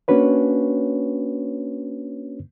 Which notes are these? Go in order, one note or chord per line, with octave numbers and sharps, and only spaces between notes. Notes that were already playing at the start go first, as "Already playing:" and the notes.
A#3 C#4 D4 F#4 B4 C#5